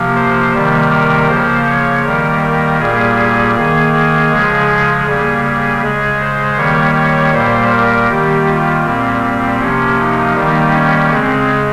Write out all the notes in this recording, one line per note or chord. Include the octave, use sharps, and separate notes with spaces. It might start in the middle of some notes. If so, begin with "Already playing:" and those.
Already playing: C3 F3 A#3
C5
C3 D#3 G3 A#3
A#4
C#3 F3 A#3 C5
C#5
D#3 G3 A#3 A#4
A#4
A#2 G3 A#3 G#4
G#4
D#3 A#3 G#4
G#4
C#3 F3 G#3
C#3 G3 A#3 G#4
G#4
C#3 G#3 G#4
C5
D#3 G3 A#3 C#5
C#5
A#2 G3 A#3 C5
A#4
D#3 G3 A#3 G4
F4
A#2 G3 A#3 C4
C3 F3 A#3 C#4
D#4
D#3 G3 A#3
C#4
C#3 G#3 C4